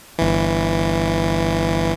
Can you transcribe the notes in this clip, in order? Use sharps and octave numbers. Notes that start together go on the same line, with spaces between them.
G1 E3